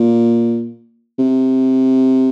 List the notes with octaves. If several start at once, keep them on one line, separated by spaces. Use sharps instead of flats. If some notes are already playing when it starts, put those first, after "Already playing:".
Already playing: A#2
C3